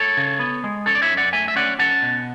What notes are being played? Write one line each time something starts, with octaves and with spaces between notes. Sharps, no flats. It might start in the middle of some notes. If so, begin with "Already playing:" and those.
Already playing: A4 C#5
C#3
B3
G#3
C#4 A4 C#5
D5
C#5 E5
F#2
D5 F#5
A3 E5 G#5
E5
C#4 D5 F#5
C#4 F#5 A5
B2